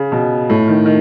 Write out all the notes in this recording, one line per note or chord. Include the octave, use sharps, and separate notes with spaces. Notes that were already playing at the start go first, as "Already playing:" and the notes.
Already playing: C#3
B2
A2
D#3
D#3